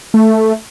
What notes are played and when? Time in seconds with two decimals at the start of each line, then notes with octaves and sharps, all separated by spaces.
0.14 A3